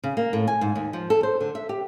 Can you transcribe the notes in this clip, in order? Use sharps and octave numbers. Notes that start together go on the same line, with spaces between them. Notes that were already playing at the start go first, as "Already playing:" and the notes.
C#3
A#3
A2
G#5
G#2
D#2
F3
A4
C5
D3
E5
G4